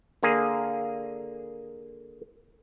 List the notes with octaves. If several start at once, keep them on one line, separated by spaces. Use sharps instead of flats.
D3 A#3 G#4